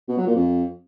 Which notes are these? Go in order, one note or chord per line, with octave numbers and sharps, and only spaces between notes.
B2
F#3
A#2
F2